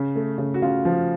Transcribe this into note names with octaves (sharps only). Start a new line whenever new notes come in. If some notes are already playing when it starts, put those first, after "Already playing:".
Already playing: C#3
A3
C#3
F#4
C#3 F4
F3